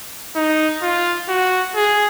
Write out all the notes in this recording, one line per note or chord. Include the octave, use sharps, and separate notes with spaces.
D#4
F4
F#4
G#4